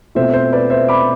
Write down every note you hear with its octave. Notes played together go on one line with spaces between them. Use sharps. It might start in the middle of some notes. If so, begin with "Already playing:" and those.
B2 A3 C4 F4 C5 E5
C5
B4 D5
C5 E5
B5 D6